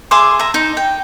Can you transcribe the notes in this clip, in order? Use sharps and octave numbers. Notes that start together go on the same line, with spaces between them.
G#4 E5 C6 D6
E5 A#5
D#4
G5